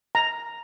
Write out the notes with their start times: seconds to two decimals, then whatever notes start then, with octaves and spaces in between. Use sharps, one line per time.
0.15 A#5